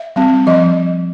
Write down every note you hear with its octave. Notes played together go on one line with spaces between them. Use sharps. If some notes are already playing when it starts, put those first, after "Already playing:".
Already playing: E5
G3 C4
F3 D#5